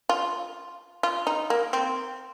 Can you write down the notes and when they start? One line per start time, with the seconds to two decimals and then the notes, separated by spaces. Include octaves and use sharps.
0.09 F4
1.03 F4
1.27 D#4
1.50 A#3
1.73 C4